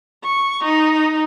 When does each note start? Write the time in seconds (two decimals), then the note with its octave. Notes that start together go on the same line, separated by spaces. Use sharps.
0.24 C#6
0.64 D#4